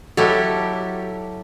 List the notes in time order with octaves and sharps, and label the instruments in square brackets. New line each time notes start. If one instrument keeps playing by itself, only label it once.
[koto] F#3 E4 G4 [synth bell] F#4 A5 [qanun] A4